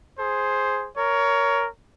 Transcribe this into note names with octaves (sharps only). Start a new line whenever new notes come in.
G#4 C5
A#4 C#5